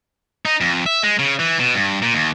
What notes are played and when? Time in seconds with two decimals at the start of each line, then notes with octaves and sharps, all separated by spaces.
0.45 D#4
0.61 F2
0.86 E5
1.03 G#3
1.19 C#3
1.40 E3
1.59 B2
1.75 G2
2.02 A#2
2.13 D#2